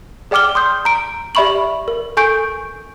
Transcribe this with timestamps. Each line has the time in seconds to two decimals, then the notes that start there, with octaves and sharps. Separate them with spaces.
0.31 G#4 D5 G5 D6 F6 G7
0.55 C6 D#6 G6
0.85 A#5 D7
1.35 G4 D5 E5 B5 C#6 F#7
1.88 A#4
2.17 A4 G#5 C#6 G6 D7